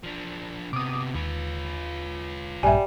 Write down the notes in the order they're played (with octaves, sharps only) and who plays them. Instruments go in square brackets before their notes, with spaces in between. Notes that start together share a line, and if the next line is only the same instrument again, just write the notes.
[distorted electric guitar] F3 D4
[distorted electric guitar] C3 B3 [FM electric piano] D6 D#6
[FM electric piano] D#2 [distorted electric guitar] F4 B4
[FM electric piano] A#1 G2 [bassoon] G3 [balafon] E5 G#5